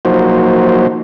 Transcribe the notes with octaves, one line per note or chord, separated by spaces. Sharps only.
F3 F#3 A#3 D#4 F#4 C5